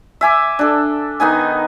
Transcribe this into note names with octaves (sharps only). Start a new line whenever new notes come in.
E5 G#5 D6
D4 A4
D#3 B3 D#4 G#5